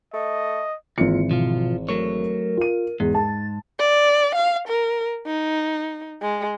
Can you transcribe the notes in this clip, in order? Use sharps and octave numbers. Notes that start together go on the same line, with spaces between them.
A3 D#5
G#1 D#2 E3 F4 C#7
B2 F3 F4
F#3 A3 A#4 C#5
F4 D#7
E2 G#2
A5 A6
D5
F5
A#4
D#4
G#3